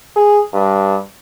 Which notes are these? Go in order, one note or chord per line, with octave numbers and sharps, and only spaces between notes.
G#4
G2